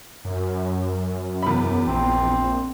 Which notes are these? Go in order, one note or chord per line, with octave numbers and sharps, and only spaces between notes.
F#2
E2 B5
A#1 C4